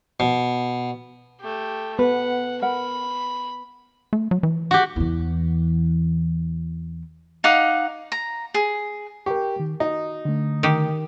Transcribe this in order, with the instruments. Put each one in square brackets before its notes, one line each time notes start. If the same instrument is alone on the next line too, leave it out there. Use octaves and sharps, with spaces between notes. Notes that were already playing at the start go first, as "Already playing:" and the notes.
[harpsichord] B2
[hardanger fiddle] A3 G4
[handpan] B3 [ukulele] B4 [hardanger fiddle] F#5
[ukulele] A#4 F#5 [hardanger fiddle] B5
[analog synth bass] A3
F#3
E3
[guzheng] F#4 G4
[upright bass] E2 E3
[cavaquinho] D#4 F5 F#5 D6
A#5
G#4
[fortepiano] G4 [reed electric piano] A#4 G5 C#6
[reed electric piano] D#3
[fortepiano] D#4 [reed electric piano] F#4
[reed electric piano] D3 A3
[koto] D#3 G4